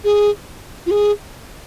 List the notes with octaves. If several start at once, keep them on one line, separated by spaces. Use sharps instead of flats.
G#4
F4
G#4